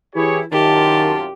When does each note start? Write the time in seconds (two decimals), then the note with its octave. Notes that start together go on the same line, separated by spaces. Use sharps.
0.15 E3 E4 G4 G#4 C#5
0.52 C2 F#2 D#3 F4 G4 A5